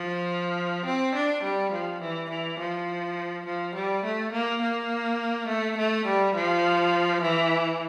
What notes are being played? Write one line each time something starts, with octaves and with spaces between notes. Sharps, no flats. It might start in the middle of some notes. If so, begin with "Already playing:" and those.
Already playing: F3
C4
D4
G3
F3
E3
E3
F3
F3
G3
A3
A#3
A#3
A3
A3
G3
F3
E3